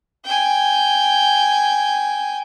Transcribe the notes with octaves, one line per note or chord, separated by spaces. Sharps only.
G5 G#5